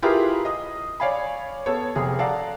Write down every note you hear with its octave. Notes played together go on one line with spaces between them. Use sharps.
E4 F4 G4 G#4 A#4 B4
D#5 D#6
C#5 D5 F5 G#5 B5
B3 A4 C#5
F1 G#4
A4 D5 F5 F#5 A#5